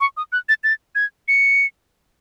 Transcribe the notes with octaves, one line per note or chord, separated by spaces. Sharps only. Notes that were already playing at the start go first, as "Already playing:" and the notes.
C#6
D#6
F#6
A6
A6
G#6
C#7